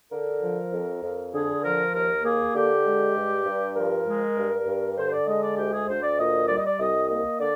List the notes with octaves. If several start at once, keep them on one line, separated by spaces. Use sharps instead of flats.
D3 A#4
F3
F2
F2
D3 G#4
F3 A#4
D#2 A#4
A#3 G#4
D3 G4
G#3
G2
G2
F3 A#4
G#3
G2
G2
D3 C5
C5
D5
G#3 D#5
D5
D2 G4
G#4
D2 C5
D5
A#2 D#5
G3 D5
D#5
D5
C2 D#5
A#3 D#5
D3 D5